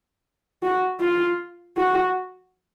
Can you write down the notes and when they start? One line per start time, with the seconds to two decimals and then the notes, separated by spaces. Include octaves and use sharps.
0.63 F#4
1.01 F4
1.77 F#4